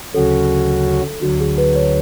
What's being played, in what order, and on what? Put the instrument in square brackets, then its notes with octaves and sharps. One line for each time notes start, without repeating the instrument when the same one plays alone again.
[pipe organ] D2 C#3 F#3 C#4 F#4 [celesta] A4
[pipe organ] D2 D3 F#3 [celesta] F#4
[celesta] G#4
B4
C#5